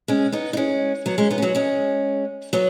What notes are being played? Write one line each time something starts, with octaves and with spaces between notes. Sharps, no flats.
G#3 C#4
B3 D#4
D#4
G#3 C#4
F#3 B3
G#3 C#4
B3 D#4
C#4
F#3 B3
G#3 C#4
F#3 B3